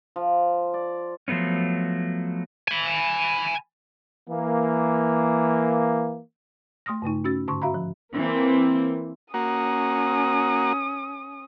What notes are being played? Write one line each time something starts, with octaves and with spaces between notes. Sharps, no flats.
F3
D5
F3 F#3 A3 B3 C#4
G#5 B5
E3 A#3
A3 C6 D#6 F6 A#6
G2 C#3 A3 D#4
C#4 F#4 E6 A6
G#2 D3 A5 C6 C#6
F#4 E5 F5 A#5 B5
F3
E3 A#3 C4
A#3 C#4 F#4 D#6